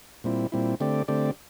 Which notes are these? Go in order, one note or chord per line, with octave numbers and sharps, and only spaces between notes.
A#2 G3 C4 E4
A#2 G3 C4 E4
D3 A3 C4 G4 D5
D3 A3 C4 G4 D5